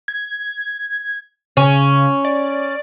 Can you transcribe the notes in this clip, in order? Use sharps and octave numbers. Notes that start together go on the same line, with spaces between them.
G#6
C#3 C#4
D5